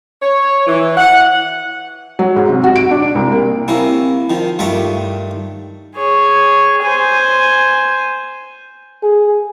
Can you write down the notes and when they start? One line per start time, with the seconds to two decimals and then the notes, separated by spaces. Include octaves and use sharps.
0.22 C#5
0.67 E3
0.98 F#5
2.19 F#3
2.36 G#2
2.49 C3
2.64 F#4
2.76 D7
2.91 D4
3.15 C2
3.32 A#3
3.68 C3 A#3 C#4 E4
4.30 D#3 F3
4.59 G2 D#3 A3 F4 C#6 D6
5.97 G#4 C#5
6.82 C5 G#5
9.03 G#4